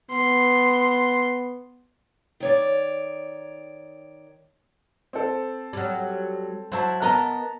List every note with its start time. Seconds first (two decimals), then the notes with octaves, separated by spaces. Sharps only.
0.11 B3 C6
2.40 D#3 C#5 D5
5.13 C4 A4
5.73 F#3 G3
6.72 F#3 E4 C5 A5
7.02 B3 A#4 D#5 A5 A#5